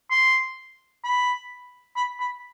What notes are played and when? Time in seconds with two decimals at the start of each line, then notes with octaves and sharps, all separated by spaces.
0.11 C6
1.04 B5
1.96 B5
2.20 B5